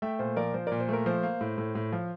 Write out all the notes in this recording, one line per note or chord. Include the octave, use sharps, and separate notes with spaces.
A3 E5 G5
A#2 C5
F3 A#4 D5
F3 C5
A#2 A#4 D5
C5
A3 A#4
F3 C5
A#3
A2
A2
A2
F3